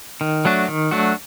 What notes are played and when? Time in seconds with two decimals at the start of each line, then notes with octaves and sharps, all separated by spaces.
0.21 D#3
0.45 F#3 A3 D4 F#4
0.68 D#3
0.91 F#3 A3 D4 F#4